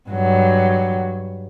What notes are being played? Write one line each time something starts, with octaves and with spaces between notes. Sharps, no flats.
G2 F#3